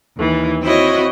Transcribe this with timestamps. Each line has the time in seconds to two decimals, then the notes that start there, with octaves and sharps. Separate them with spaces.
0.16 D#2 E3
0.61 C4 E4 F#4 C#5 D#5